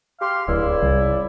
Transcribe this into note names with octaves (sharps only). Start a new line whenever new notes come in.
G4 F5 C6
D1 C#2 E4 D5
C2